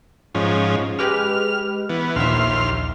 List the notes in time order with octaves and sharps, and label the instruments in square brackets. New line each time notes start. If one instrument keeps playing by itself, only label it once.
[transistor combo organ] G#2 F3 C#4
[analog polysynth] G#3 G4 B4 [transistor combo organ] F6
[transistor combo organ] E3 B3
[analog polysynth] A#1 E5 [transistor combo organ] D#2 C6 F6